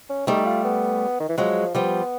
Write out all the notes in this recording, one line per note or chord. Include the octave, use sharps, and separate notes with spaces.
C#4
G3 A3 D#4
F4
B3
D#3
E3
F3 F#3 G#3
F3 G3 B3